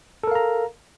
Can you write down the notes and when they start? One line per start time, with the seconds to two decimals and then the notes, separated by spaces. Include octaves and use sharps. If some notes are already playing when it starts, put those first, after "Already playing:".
0.23 A4
0.27 A#4
0.31 F5
0.35 A#5